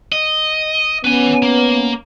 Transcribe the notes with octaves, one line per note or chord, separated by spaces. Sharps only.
D#5
B3 C#4 B4 G#5
A#3